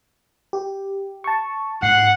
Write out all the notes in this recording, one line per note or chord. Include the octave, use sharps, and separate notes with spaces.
G4
A5 C#6
G#2 F#5 C7